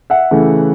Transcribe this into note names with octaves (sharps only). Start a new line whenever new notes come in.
E5 F#5
C#3 E3 A3